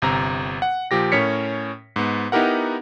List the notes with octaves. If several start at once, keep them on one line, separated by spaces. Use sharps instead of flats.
G1 C3 A#5
F#5
A#2 F3 G4 A#6
A2 C#4 A#4 C#5 B6 C#7
G#2 B3
B3 D#4 E4 G4 A#4 F#5